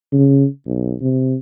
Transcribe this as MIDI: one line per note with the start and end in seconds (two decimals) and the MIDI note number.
0.12 0.46 49
0.67 0.95 35
1.01 1.36 48